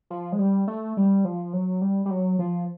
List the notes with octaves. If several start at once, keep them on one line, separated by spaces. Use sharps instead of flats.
F3
G#3
G3
A3
G3
F3
F#3
G3
G3
F#3
F3